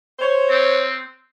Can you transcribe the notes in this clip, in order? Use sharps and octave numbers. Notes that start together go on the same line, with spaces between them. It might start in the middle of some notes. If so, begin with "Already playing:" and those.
C5 C#5
C4